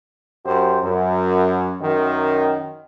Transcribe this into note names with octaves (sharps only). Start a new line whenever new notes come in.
F#2 G4 C5
F#2
F#2 D#3